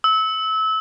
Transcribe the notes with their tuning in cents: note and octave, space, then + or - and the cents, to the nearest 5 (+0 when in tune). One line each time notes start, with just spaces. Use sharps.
E6 -25